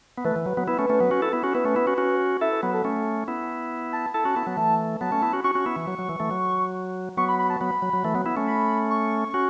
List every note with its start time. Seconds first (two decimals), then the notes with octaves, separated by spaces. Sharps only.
0.18 B3
0.25 E3 A3 B4
0.36 E3
0.46 F#3
0.57 F#3 B3
0.67 B3 E4 B4
0.79 A3 C#4
0.90 A3 C#4
1.00 F#3 B3
1.11 C#4 F#4
1.22 E4 A4
1.33 B3 E4
1.43 C#4 F#4
1.55 B3 E4 B4
1.65 A3 C#4
1.76 B3 E4
1.87 C#4 F#4
1.98 C#4 F#4
2.41 E4 A4 E5
2.52 B4
2.63 F#3 B3 B4
2.74 A4
2.85 A3 C#4
3.28 B3 E4
3.93 A5
4.14 E4 A4 A5
4.25 C#4 F#4
4.36 B3 E4
4.47 F#3 B3
4.57 E3 A3
5.01 F#3 B3 A5
5.12 A3 C#4
5.22 B3 E4
5.33 C#4 F#4
5.44 C#4 F#4 C#6
5.55 C#4 F#4
5.66 B3 E4
5.76 E3
5.87 F#3
5.99 F#3
6.09 E3
6.20 E3 A3
6.31 F#3
7.17 F#3 B3 C#6
7.29 B5
7.39 B5
7.50 A5
7.61 F#3 B3 B5
7.82 F#3
7.93 F#3
8.04 E3 A3
8.15 F#3 B3
8.26 B3 E4
8.37 A3 C#4
8.47 B5
8.90 C#6
9.34 C#4 F#4